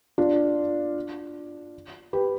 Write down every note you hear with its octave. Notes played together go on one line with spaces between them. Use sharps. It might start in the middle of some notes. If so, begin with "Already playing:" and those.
D4 F4
G4 B4